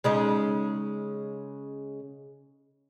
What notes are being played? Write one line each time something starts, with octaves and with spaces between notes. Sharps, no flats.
C#3 G#3 D#4